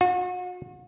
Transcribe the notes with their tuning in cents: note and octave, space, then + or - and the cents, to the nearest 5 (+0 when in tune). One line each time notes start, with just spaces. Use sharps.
F#4 -40